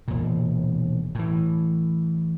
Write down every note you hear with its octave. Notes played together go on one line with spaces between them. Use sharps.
E1 A#2
A2 E3